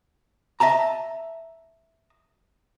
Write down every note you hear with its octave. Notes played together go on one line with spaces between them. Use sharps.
D#5 E5 A5 A#5